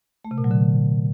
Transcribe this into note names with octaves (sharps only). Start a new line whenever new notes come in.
A3
C3
A#2
F#3
D3